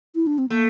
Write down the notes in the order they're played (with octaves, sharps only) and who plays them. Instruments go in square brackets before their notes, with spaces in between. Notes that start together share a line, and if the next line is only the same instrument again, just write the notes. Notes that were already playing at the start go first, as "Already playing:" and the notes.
[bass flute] E4
D4
C4
[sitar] A3 [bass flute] A#3